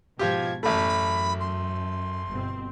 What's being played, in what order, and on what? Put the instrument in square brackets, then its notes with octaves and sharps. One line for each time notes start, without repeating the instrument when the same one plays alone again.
[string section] G#2 B2 G#6 [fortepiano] F3 F4 G4
[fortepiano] A1 A3 [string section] F#2 [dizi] B5
[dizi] C6
[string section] G1 B2 C4